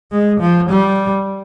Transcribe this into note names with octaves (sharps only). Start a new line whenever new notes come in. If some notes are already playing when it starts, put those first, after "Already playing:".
G#3
F3
G3